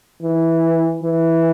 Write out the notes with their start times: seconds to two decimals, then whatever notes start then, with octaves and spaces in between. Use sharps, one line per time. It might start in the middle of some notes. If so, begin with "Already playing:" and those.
0.23 E3
1.04 E3